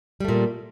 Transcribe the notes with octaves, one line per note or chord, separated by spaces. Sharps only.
A#2 G3 A3